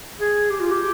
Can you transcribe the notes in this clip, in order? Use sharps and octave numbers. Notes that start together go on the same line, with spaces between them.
G#4
G4
F4
G4